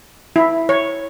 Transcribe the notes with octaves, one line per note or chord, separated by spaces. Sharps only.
E4
C#5